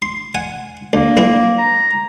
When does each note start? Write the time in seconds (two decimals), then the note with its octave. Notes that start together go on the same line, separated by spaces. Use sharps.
0.02 C6
0.35 F#5 G#5
0.93 D2 A#3
1.17 B1 C4 E4
1.59 A#5